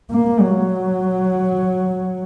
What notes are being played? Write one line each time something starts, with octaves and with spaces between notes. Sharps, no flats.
A#3
F#3